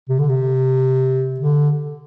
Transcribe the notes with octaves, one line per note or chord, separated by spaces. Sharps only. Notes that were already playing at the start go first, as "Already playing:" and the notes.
C3
D3
C3
D3